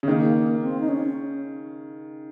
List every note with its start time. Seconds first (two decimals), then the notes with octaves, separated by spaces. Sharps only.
0.03 C#3
0.07 D#3 A#3
0.62 C4
0.80 D#4
0.89 C#4